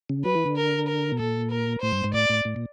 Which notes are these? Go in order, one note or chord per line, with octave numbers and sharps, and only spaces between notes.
C#3
F#3 B4
E3
D3
A#4
A#4
B2
A#2 A4
A#4
A2 C5
G2
G#2
A2 D5
A2
A2
A#2